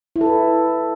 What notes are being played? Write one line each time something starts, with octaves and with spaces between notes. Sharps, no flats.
E4
A4
B4